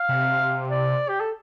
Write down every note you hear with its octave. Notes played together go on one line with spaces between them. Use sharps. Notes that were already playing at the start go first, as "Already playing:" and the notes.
Already playing: F5
C3
D5
G4
A4